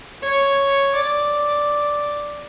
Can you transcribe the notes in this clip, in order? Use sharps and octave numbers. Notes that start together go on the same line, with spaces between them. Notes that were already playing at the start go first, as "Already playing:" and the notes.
C#5
D5